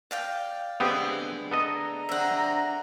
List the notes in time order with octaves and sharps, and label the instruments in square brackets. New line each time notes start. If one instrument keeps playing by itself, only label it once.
[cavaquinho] D5 F5 G5
[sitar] D3 G#3 A3 [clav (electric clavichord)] B3 C4 G4
[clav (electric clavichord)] B3 A4 D#5 [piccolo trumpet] A#5
[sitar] D3 C4 D4 [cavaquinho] E5 F#5